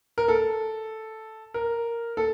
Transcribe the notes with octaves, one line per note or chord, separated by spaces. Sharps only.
A#4
A4
A#4
A4